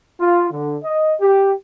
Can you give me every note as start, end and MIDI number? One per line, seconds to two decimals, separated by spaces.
0.19 0.48 65
0.51 0.77 50
0.83 1.14 75
1.21 1.53 67